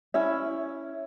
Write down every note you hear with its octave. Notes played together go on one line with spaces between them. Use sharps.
C#4 E4 E5